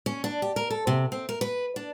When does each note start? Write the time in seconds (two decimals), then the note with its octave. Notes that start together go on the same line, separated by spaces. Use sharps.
0.06 C#4
0.24 D4
0.42 G4
0.56 A#4
0.70 A4
0.87 C3
1.12 C4
1.29 A#4
1.41 B4
1.76 D4